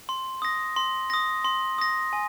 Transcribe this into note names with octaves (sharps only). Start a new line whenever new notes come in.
C6
D#6 A#6
C6
D#6 A#6
C6
D#6 A#6
G#5